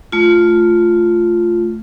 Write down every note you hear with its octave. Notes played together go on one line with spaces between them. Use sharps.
A3 F4